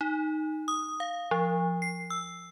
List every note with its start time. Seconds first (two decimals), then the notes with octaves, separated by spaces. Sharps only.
0.01 D#4
0.68 D#6
1.00 F5
1.31 F3
1.82 C7
2.10 E6